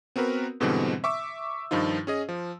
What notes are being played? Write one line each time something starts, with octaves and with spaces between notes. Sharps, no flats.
B3 C4 F#4 A#4 B4
G#2 B2 D3 E3 G3 C4
E5 C#6 D6 E6
G2 D#3 F3 D#4 F4
C#4 G#4 D#5
F3